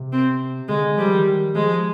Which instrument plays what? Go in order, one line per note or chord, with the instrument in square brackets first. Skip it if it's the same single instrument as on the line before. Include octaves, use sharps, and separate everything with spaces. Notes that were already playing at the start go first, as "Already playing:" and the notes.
Already playing: [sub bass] C3
[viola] C4
[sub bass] D3 [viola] G#3
[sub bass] F3 [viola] G3
[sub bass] D#3
[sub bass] F3 [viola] G#3